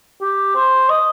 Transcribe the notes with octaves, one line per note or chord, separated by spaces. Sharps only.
G4
C5
D#5